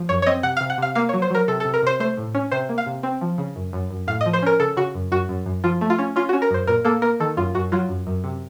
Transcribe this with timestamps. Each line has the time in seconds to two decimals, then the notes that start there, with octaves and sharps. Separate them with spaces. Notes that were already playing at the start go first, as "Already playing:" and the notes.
Already playing: F3
0.09 F#2 C#5
0.22 C#5
0.26 C4 D#5
0.43 C3 F#5
0.57 C3 F5
0.70 F#5
0.78 C3 F5
0.95 A#3 F5
1.09 F#3 C#5
1.22 C5
1.31 F#3 A#4
1.48 C3 A4
1.60 C3 A4
1.74 A#4
1.82 C3 C5
2.00 A3 C5
2.17 A2
2.35 C#4
2.52 C3 C5
2.69 A#3
2.78 F5
2.86 C3
3.03 C4
3.21 F3
3.38 C#3
3.56 F#2
3.73 F#2
3.91 F#2
4.07 A2 F5
4.21 D#5
4.26 F3
4.33 C5
4.43 C#4 A#4
4.60 C#3 A4
4.77 C#3 F#4
4.94 F#2
5.12 F#2 F#4
5.29 F#2
5.46 F#2
5.64 F3 F4
5.81 A3
5.90 F4
5.99 C#4
6.16 C#4 F4
6.29 C#4 F#4
6.42 A#4
6.51 F#2 C5
6.67 A#2 A#4
6.85 A#3 A4
7.02 A#3 A#4
7.20 D#3 A4
7.37 F#2 F4
7.55 F#2 F#4
7.72 F#3 F4
7.89 F#2
8.07 F#2
8.24 C3